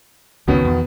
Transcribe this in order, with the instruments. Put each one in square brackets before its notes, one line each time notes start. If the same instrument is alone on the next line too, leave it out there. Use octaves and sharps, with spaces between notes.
[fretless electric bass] C#2 F#2 C#4 [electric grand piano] B2 D#3 B3
[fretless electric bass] E2